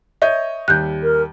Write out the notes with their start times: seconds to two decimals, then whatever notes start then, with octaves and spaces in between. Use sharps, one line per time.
0.22 C#5 D#5 E5 G6
0.68 D#2 G3 F#6 G6
1.03 A#4